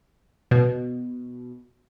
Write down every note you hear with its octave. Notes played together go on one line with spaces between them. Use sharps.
B2